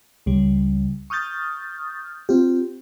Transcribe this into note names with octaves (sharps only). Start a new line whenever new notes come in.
C#2 C#3 G3
C#6 D#6 F6 G6 A6
C4 F4 G4